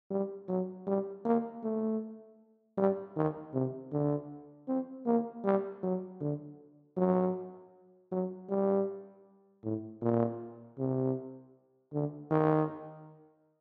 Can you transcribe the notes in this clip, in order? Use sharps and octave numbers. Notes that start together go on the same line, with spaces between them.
G3
F#3
G3
A#3
A3
G3
D#3
C3
D3
C4
A#3
G3
F#3
D3
F#3
F#3
G3
A2
A#2
C3
D3
D#3